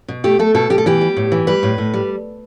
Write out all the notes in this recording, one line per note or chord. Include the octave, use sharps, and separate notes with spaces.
B2
A3 G4
A3 A4
B2 A4
B2 G4
A4
E3 G4
G3
A2
E3
G3 B4
A2
A2
G3